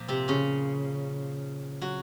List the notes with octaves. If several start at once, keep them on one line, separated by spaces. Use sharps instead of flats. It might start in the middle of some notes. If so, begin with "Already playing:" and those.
Already playing: A#2 F3
C3 C4
C#3 C#4
F#3 F#4